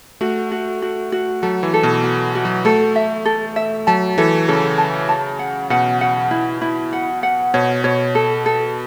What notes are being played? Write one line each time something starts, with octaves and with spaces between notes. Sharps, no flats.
A3 F#4
F#4
F#4
F#4
F#3 A4
E3
A4
B2
F#4
F#4
F#3
A3 A4
E5
A4
E5
F#3 A5
E3 A4
C#3 A4
A5
A5
F#5
B2 F#5
F#5
E4
E4
F#5
F#5
B2 C#5
B2 C#5
A4
A4